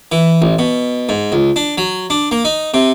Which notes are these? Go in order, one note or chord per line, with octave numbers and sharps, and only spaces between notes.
E3
A1
B2
G#2
C#2
D4
F#3
D4
A#3
D#4
C3